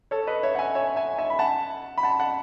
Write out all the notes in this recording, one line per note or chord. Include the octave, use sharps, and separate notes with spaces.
A4 C#5
B4 D#5
C#5 E5
F#5
E5 G#5
C#5 E5
E5 G#5
E5 G#5
B5
F#5 A5
B5
F#5 A5
F#5 A5